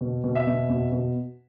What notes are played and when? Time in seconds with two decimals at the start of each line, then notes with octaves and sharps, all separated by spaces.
0.01 B2
0.24 B2
0.35 E5
0.47 B2
0.69 B2
0.92 B2